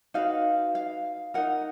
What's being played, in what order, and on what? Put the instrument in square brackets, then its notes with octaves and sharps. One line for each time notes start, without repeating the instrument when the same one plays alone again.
[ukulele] D#4 F#4 B4 F5
F5
D#4 A#4 F#5